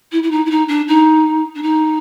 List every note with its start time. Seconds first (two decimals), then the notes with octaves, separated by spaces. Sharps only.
0.12 E4
0.23 E4
0.31 D#4
0.46 E4
0.50 D#4
0.68 D4
0.88 D#4
1.55 D4
1.63 D#4